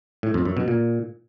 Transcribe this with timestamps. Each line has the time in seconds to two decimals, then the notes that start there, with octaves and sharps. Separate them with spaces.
0.23 A2
0.34 F2
0.45 F#2
0.57 B2
0.68 A#2